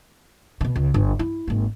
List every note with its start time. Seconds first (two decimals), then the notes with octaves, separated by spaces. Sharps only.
0.61 B2 D3
0.76 C#2
0.94 G1
1.19 E4
1.48 G#1 A#3